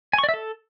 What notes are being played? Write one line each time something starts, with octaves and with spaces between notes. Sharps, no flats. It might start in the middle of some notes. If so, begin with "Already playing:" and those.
G#5
C#6
D5
E5
A4